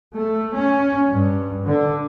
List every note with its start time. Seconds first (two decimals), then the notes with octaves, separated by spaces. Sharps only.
0.16 A3
0.57 C#4
1.11 G2
1.66 D3